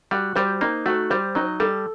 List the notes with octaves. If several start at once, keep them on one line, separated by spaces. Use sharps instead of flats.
G3 F#4
G3 C5
A#3 D#4
A3 F#4
G3 C5
F#3 D#4
G3 A4